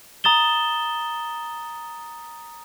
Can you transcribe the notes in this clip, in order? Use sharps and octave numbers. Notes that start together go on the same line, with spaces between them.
A#5 D#6 A6 E7 G7